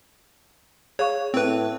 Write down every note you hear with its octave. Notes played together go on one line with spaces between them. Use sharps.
G#4 C#5 F5 C#6
A2 C4 B4